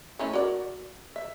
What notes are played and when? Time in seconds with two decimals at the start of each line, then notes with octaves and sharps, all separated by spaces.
0.19 A3 C#4 E4
0.33 F#4 A#4 D5
1.16 E5